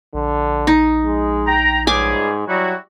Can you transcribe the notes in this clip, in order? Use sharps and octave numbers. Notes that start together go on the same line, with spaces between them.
A#1 D3
D#4
G#3
G5 A#5
C#2 G#2 G3 G#4 G#5 D6
F#3 G3 E4 F#4